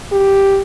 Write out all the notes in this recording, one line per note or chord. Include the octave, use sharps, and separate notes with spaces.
G4